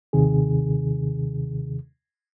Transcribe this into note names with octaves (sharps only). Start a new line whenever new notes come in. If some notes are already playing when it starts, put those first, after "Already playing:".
D#2 C3 D#3 G#4